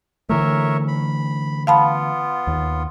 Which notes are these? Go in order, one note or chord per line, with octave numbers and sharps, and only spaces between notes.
D3 E3 A3 A#4 C#5 E5
B5
B3 F4 F5 A5 B5
D#2